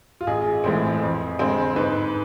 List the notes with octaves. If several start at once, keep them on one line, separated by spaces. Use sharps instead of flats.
F4
A1 G#4
A2 E3 G#3 C4
F2
D3 G#3 C4
G#2 B4